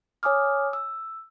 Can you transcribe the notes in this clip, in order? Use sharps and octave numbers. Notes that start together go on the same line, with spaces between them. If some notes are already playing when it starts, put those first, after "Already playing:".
C#5 G#5 D6 D#6 F6
E6